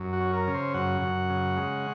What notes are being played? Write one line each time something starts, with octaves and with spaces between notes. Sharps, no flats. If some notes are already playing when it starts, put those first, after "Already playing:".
Already playing: F#2
F#4
C#4
A#4
C#3
C5
F#2 F#5
F#2
C#3
G#3